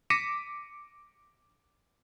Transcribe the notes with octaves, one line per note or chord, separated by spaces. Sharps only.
D6 A#6 B6 C#7 D#7 E7